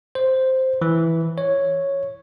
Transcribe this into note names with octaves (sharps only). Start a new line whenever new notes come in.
C5
E3
C#5